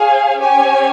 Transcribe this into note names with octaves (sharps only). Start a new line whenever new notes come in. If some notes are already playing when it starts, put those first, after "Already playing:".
Already playing: G#4 C#5 F5 G#5
C#4 G4 C#5 G#5